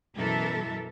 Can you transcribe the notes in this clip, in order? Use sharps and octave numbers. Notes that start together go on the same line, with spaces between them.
F#2 B2 E3 A4 A#4 E5